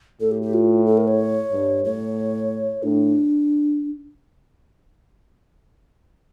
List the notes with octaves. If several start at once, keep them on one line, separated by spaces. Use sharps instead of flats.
A2 A4
G4
G4
F4
A4
A#4
C#5
G2
A2 C#5
A2 D4